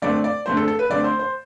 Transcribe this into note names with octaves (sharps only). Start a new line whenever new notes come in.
D3 A3 C4 D5
D5
D3 A3 C4 C5
A4
A4
B4
D3 A3 C4 D5
C5
C5